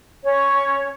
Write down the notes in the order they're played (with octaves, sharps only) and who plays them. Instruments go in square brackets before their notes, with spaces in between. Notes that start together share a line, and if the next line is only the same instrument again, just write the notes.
[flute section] C#4 C#5